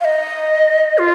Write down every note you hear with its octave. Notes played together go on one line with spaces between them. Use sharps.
F5
D#5
F4